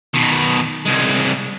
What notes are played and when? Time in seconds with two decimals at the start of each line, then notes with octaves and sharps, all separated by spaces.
0.14 B2 D#3
0.85 C2 G#3